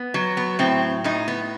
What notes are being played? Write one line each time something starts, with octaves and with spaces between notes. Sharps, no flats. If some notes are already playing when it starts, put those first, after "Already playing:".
Already playing: B3
F#3
B3
A2 C4
A2 D#4
B3